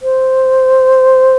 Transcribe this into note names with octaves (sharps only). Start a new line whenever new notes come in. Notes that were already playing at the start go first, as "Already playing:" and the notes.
C5